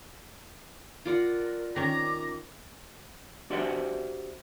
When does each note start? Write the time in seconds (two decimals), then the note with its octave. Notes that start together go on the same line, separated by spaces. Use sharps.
1.05 F4 A#4 D5 F#5
1.76 D#3 C#4 A#5 D6
3.50 D4 F#4 G4 C5 D5 E5